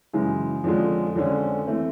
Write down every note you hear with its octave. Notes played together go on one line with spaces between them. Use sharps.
F#2 C#3 E3 G#3
F2 D3 F3 G#3 C#4
F2 D3 F3 G#3 C#4
E3 A3 C4